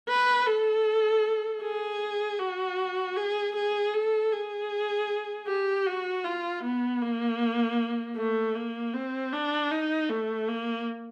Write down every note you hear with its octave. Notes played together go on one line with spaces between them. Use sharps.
B4
A4
G#4
F#4
G#4
G#4
A4
G#4
G4
F#4
F4
B3
A#3
A3
A#3
C4
D4
D#4
A3
A#3